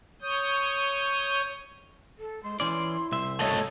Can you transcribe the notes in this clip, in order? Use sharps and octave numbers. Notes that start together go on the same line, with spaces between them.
C#5 D#6 G6
A4
G#3 C6
E3 C#4 E4 D5 C6
C2 E5 C6
A3 A4 C#5 D#5